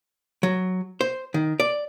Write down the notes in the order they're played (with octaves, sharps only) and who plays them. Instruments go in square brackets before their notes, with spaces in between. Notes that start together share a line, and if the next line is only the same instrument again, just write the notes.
[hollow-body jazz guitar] F#3
C5
D#3
D5